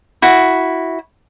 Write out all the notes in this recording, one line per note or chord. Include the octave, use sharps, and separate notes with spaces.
E4 F#4